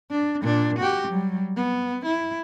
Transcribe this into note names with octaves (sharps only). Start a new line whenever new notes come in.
D4
A#2 D4
F#4 G4
F#3 G3
B3
E4